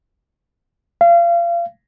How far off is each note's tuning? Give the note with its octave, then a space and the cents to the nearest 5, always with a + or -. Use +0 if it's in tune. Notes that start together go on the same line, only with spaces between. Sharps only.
F5 -30